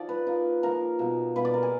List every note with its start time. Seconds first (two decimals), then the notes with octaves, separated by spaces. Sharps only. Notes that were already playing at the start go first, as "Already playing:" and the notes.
Already playing: F3 D#4 D5
0.09 B4
0.27 F3 A#3 D#4
0.63 F3 A#3 D#4 A#4
0.99 B2 A#3 D#4
1.36 B2 A#3 D#4 B4
1.45 D5
1.54 A#4
1.63 G#4